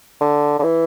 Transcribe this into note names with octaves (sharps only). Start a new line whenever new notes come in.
D3
D3
E3